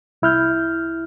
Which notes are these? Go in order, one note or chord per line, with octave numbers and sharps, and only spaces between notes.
C2 E4 F6 G6